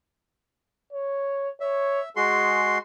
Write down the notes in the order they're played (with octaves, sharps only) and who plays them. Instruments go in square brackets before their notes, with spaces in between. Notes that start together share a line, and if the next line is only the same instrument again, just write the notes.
[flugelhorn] C#5
[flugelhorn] C#5 [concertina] E5
[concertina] G#3 F#4 C6 [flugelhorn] G#4